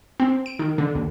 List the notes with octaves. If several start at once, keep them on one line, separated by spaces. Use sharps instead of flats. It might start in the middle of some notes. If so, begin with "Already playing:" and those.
C4
D7
D#3
D3
D#2